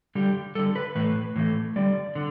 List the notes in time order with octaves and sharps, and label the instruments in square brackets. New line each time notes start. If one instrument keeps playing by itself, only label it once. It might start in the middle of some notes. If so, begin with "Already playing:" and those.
[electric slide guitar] D3 G3 G4
G3 A4
D3
B4
A2 E3 A3 B4
A2 E3 A3
D3 G3 D5
D3